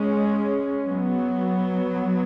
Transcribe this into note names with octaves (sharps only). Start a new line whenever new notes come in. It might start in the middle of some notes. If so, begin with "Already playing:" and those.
Already playing: G#3 C#4
F#3 B3